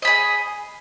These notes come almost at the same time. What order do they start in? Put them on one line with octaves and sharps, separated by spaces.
D#5 B5 G#4